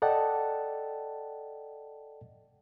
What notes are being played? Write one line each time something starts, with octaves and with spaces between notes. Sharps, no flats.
A4 D5 D#5 F#5 G5 A5